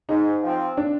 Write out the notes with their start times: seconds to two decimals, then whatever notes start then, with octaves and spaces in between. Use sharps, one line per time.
0.09 G#2 D#4
0.43 F3 C4
0.77 D4